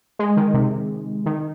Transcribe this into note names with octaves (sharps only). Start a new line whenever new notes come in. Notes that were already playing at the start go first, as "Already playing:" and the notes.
G#3
D#3
C3
D#3